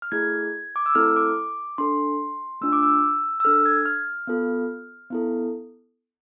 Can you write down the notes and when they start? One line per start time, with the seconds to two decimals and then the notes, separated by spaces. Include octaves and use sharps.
0.02 F6
0.12 A3 E4 G#4 G#6
0.76 D6
0.86 E6
0.95 A3 C4 E4 A4 F6
1.16 D6
1.78 D4 A4 C6
2.61 A3 D4 F4 E6
2.73 D6
2.83 E6
3.40 E6
3.45 D4 A4 F6
3.66 G#6
3.85 F6
4.27 B3 F4 A4
5.10 B3 E4 A4